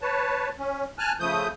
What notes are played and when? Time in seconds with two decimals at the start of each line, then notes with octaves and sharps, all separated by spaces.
0.01 B4 C#5 A5
0.58 C#4
0.99 G#5 A5 F6 F#6
1.20 C#3 F3 A3 D#6 G6